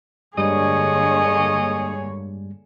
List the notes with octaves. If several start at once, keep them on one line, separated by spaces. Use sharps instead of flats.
G2 D3 G3 G#3 A#3 G#4 C#5 D#5